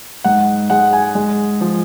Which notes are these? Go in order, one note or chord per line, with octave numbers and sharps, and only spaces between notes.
G#2 F#5
G#3 F#5
G#5
G#3
F3